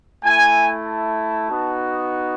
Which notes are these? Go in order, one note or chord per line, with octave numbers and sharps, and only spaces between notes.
A3 E4 G#5
A5
B3 D#4 F#4